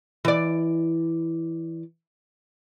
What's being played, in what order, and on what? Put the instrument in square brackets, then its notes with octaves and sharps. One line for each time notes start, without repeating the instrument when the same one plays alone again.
[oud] E3 D5